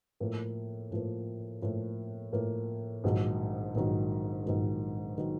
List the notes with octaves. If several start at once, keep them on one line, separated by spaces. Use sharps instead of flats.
A2 F3 A#3
A2 F3 A#3
A2 F3 A#3
A2 F3 A#3
A#1 G#2 D#3 F#3
A#1 G#2 D#3 F#3
A#1 G#2 D#3 F#3
D#3 F#3